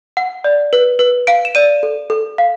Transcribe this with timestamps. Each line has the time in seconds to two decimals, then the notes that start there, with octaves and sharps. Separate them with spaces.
0.17 F#5
0.44 D5
0.73 B4
0.99 B4
1.27 F5 D7
1.45 E7
1.55 D5 D#7
1.83 A4
2.10 A4
2.38 F5